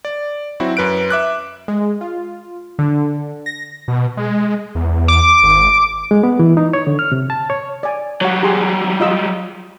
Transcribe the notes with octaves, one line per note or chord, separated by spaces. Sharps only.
D5
F#3 C4 E4 F#4
F#2 B4 F#6 D7
E5 D6 F#6
G#3
F4
D3
A#6
B2
G#3
E2
D6
G#1
G#3
B3
E3
D#4
C#5
D3
F6
C3
A5
C#5
D5 G#5
F#3 G3 C#5 F#5
G4 G#4 C6
F4 D#5 E6